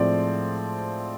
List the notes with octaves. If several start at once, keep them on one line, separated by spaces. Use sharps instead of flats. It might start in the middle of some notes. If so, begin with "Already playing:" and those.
Already playing: A2 F3 G#3 C4 D5